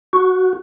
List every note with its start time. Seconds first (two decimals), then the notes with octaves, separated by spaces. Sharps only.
0.13 F#4